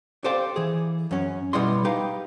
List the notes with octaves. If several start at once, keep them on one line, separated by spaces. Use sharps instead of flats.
G4 A4 C5 D5 F5 G5
E3 G#4
F#2 C#4
B2 G3 B3 E4 D#5 C6
D#4 G4 B4 F5